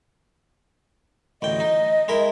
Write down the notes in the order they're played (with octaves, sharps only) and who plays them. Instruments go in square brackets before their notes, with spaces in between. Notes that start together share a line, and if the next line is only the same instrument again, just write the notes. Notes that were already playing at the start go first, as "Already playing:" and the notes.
[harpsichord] A1 D2 G5 [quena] D#5
[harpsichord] D#4
G#3 E4 A#4